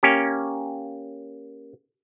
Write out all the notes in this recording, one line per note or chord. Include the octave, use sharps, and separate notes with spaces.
A#3 C#4 G4